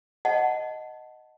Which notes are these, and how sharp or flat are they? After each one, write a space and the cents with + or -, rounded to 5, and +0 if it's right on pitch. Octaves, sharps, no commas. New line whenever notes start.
D#5 +0 F#5 +0 A5 +0